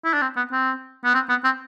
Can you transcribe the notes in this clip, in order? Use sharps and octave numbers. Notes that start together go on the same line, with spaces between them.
E4
D4
C4
B3
C4
B3
C4
B3
C4